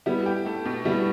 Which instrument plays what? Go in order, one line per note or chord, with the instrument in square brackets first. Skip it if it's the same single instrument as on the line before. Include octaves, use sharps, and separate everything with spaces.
[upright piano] G3 B3 [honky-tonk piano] E4
[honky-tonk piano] G4
A3
B2
[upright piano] G3 B3 [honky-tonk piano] E4